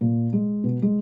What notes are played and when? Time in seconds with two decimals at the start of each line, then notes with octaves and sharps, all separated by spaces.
0.01 A#2
0.33 G#3
0.64 B2
0.82 G#3